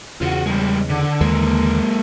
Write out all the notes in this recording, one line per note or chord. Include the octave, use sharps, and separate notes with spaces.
E2 C#3 F4 F#4
G3 G#3
D3
D#2 D3 E3 G#3 A#3